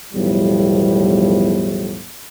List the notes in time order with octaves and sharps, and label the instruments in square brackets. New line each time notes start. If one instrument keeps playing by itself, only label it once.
[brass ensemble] B1 E2 A2 F3 G3